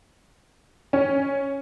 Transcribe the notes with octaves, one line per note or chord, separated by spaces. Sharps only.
C#4